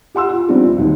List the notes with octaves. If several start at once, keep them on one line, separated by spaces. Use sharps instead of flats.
G4 F#5 C6 E6
F4
F3 G3 B3 C4 D4 D#4
D2
D#2 D#3 F#3